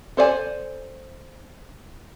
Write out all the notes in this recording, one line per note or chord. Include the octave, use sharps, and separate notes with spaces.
A4 C5 D5 E5 G#5